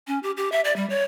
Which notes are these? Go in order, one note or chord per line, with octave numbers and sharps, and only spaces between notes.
C#4
G4
G4
E5
D5
G3
C#5